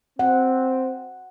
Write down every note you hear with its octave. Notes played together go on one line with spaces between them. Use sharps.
C4 F#5